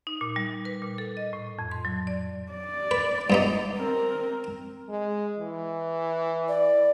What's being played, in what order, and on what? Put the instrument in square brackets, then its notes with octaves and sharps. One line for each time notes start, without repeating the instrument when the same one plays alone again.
[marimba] D#4
A#2
G3
B4
A#2
A4
D#5
A2
F2
C6
F#3
D5
[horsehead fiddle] D5
[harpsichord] B4
G2 B3 D#4
[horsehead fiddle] C4 A#4
[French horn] G#3
E3
[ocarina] D5